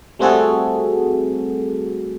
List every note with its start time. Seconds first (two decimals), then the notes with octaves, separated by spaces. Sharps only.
0.19 G3 A3 C4 F#4 G#4 A4